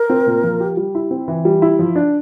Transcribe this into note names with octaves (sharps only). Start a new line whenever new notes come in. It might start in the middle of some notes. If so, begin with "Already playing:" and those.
Already playing: A#4
C4
A#2
F3
G4
G3
E4
C4
E3
G3
E4
F3
D4